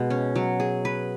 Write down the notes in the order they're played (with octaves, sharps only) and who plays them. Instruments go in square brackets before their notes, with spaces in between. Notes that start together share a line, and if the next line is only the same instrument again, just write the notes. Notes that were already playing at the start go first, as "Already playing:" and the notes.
Already playing: [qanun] B2 G#3 G#4
C#4
F#3
G#4
B4